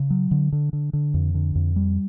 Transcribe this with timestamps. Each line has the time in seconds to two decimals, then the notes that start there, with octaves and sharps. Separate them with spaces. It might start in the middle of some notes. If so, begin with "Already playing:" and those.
Already playing: C#3
0.10 F#3
0.31 D3
0.52 D3
0.73 D3
0.93 D3
1.14 F2
1.34 D3
1.55 F2
1.76 G3